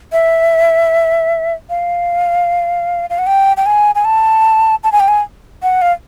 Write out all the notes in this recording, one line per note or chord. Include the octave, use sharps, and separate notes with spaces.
E5
F5
F5
F#5
G5
G5
G#5
G#5
A5
A5
G#5
G5
G#5
F#5
F5